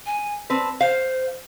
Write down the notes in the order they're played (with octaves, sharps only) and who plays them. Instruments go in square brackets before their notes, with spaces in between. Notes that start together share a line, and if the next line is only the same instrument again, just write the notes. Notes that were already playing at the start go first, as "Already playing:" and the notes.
[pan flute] G#5
[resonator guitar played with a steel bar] C4 B4 [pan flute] A5
[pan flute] C5 [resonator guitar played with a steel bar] F5